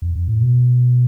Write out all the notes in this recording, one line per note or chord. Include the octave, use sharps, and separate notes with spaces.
F2
F2
A2
B2